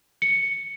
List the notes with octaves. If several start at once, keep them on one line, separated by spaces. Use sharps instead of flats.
C#7